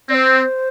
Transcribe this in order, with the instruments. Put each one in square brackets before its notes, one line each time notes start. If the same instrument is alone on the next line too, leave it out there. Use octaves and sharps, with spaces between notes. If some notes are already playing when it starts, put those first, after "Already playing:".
[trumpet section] C4 [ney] C5 D5